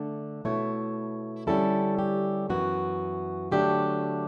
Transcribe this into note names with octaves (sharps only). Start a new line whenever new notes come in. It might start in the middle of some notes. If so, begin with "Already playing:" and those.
Already playing: D3 A3 D4
B2 A3 E4 C#5
D3 G3 C#4 E4 A4
G4
F#2 E3 B3 F#4
D3 F#3 A3 D4 G4